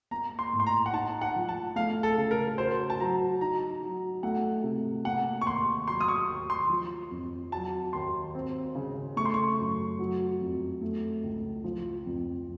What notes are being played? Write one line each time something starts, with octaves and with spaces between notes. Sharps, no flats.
A#3 A#5
C6
A2
C6
A#5
F#5
D#4 A5
F#5
F3
A5
A3 F5
A4
C#3
A#4
F#4 C5
A5
F#3 A#5
D#4 A#5
F#3
A3 F#5
C3
A#3 F#5
C#6
D#2 C6
F#3 C6
D#6
C#6
D#2
C6
F3
F2
F#3 A5
D#2 C6
C4
C#3
A3 C#6
C6
C#6
F#2
F#3
F2
A3
C#2
F3
F2